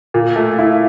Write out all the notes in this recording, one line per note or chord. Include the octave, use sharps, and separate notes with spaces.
A#2
A3
E4